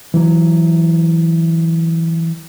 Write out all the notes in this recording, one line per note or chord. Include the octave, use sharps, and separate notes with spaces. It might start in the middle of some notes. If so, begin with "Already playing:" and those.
E3 F#3